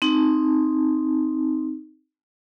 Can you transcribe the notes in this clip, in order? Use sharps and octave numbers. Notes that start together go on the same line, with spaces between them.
C4 D#4